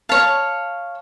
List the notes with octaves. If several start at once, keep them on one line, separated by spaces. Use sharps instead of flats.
C#5 F5 A5